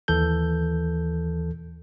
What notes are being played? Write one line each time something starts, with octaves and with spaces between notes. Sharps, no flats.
D#2 E3 A4 G6